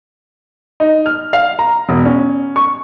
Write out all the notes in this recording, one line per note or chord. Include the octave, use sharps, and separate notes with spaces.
D#4
F6
F5
A#5
E1
C#4
C#6